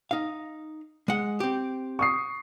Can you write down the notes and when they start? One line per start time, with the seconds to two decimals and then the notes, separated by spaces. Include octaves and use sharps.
0.11 D#4 F5
1.08 G#3 F#5
1.40 C4 G4
1.99 C#6 D#6 C7